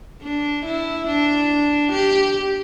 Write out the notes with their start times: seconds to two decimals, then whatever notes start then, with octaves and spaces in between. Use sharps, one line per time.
0.22 D4
0.65 E4
1.07 D4
1.92 G4